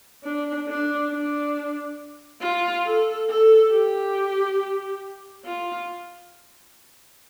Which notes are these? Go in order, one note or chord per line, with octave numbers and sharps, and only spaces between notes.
D4
D4
D4
F4
A4
A4
G4
F4